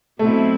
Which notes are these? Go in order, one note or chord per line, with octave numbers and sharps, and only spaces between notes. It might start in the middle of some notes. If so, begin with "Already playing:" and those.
B2 F#3 A3 C4 E4